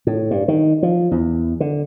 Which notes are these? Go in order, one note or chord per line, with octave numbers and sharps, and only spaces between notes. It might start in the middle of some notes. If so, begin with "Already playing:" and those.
A2
G2
D#3
F3
E2
D3